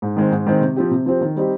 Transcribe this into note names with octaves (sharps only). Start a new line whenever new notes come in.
G#2
D#3 G#3 C4
G#2
D#3 G#3 C4
C3
F3 C4 G4
C3
F3 C4 G4
D#3
G3 C4 D#4 G4